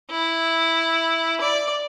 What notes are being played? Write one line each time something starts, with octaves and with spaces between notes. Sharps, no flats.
E4
D5